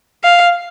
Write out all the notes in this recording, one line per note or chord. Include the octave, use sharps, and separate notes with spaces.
F5